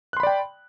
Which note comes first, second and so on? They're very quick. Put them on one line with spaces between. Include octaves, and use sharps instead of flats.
F#6 C6 B5 D5 G5